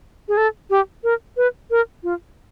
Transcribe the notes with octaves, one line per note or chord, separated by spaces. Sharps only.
G#4
A4
G4
A#4
B4
A#4
F4